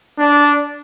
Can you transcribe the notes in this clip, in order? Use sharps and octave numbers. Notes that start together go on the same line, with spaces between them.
D4